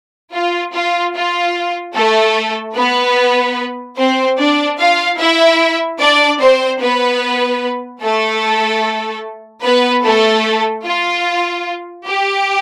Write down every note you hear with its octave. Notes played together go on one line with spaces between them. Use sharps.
F4
F4
F4
A3 A4
B3 B4
C4 C5
D4 D5
F4 F5
E4 E5
D4 D5
C4 C5
B3 B4
A3 A4
B3 B4
A3 A4
F4
G4